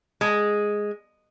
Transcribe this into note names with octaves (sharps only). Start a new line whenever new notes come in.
G#3